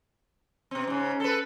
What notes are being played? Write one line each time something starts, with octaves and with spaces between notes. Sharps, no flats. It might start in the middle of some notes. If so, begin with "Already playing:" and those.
B2 C4
G#2 C#3
A4 B4